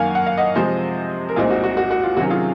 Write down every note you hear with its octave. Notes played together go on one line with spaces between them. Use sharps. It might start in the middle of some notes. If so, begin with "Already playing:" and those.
Already playing: F#2 D#3 A#3 F5 F#5 G#5
F#5
F5
D#5 F#5
C3 F3 G#3 C5 D#5
A#4
C2 A#2 G#3 C4 D#4 F4 G#4
F#4
F#4
F#4
F#4
F4
C3 D#3 F#3 C#4 F#4
F4 G#4